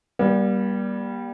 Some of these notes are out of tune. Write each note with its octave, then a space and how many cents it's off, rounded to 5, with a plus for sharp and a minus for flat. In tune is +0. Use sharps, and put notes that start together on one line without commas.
G3 +0 A#3 +45